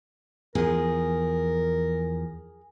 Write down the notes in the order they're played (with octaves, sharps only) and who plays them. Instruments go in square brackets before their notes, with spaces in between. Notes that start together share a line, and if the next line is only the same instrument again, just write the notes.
[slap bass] E2 F3 [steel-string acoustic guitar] G#4 [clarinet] A#4